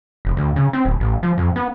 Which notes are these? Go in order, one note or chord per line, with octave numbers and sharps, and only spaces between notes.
F1
D2
C#3
C4
D1
A1
F3
F2
B3